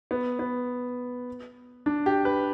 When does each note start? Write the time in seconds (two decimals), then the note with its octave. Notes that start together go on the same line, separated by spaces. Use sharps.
0.11 B3
0.39 B3
1.86 D4
2.06 G4
2.25 B4